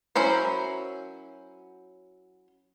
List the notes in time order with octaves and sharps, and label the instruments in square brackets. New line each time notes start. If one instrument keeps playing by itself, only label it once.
[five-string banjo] F#3 C#4 E4 A#4 C5